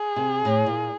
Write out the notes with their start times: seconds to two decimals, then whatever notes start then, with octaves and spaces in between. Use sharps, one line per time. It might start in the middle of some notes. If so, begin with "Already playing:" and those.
Already playing: G#4
0.16 C3
0.45 A2
0.66 A#2